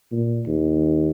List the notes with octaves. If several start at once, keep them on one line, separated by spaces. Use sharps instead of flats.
A#2
D#2